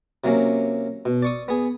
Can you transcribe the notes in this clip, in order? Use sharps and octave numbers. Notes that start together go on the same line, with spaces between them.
C3 F#3 A#3 C#4
B2
D5 C#6 D#6
B3 G#4